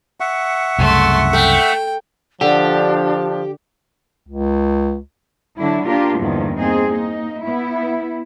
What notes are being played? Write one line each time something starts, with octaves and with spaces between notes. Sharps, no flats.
E5 F#5 C#6
C2 F#2 C#3 A3 C6
A3 G5
D3 F3 D4 G4
C#2
D3 F#3 D4 E4
A#3 D4 F4 G4 A#4
E2 G2 A#2 D3 D#3 F3
A#3 C4 D#4 G#4
A#3 D#4
B3 E4